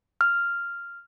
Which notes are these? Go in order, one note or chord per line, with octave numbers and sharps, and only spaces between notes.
F6